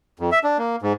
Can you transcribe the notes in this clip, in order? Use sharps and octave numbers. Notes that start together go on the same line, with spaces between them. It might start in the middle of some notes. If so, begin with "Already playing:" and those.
F2
E5
D4
A#3
G#2